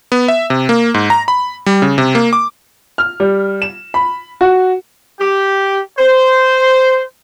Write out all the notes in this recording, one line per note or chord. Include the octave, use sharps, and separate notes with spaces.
B3
E5
C3
A#3
G#2
A#5
B5
G3
C#3
C3
A#3
D6
F6
G3
E7
B5
F#4
G4
C5